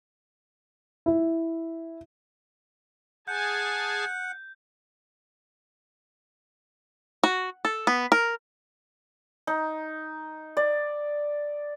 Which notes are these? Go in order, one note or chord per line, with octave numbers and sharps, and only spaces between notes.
E4
G#4 F#5 G#5 A5 G6
F#4
A4
B3
A#4
D#4
D5